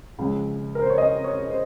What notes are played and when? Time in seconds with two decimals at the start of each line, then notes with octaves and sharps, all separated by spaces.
0.19 C#2 C#3 F3
0.75 A#4
0.82 C5
0.90 C#5
0.98 D#5
1.24 C#5
1.50 C5